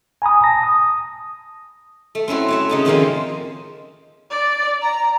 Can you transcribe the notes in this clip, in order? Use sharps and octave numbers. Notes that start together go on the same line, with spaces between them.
G#5 A#5 B5 D#6
A5 A#6
D#6
A3
C4 C#4 E4 F#4
A3 C#5 E5
C#3 D#4 A#5
D#3 F3 G#3 A#3 C4 C#4
D5
A#5